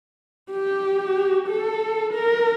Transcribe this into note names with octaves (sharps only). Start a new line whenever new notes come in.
G4
A4
A#4